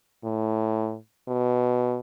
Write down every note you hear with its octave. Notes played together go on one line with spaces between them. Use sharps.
A2
B2